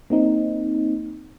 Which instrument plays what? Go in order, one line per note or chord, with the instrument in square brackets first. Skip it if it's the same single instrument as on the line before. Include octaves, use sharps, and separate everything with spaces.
[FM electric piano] A#3 C4 D#4